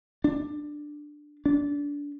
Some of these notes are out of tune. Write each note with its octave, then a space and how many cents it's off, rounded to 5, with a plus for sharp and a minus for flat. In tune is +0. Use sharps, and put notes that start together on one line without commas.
D4 +10
D4 -25